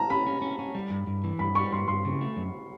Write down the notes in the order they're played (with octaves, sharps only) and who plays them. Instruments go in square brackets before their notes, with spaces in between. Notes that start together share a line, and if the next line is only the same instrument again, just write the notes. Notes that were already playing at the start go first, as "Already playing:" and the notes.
Already playing: [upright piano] A5 A#5
[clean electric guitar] C#4 [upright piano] B5
[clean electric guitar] C#4
C#4
C#4
G3
G2
G2
E3
[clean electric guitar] G2 [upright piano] B5
[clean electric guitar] G3 [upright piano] C#6
[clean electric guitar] G2 [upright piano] C6
[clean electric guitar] G2 [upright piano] C6
[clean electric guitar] C#3
A3
F#2